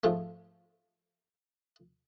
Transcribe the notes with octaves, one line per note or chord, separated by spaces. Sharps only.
G#2 F3 G#3 A3